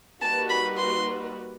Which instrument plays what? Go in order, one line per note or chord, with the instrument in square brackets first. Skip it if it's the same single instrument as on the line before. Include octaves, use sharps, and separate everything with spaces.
[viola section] G3 A#3 D#4 F#4 B4 [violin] A5
[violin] B5
C6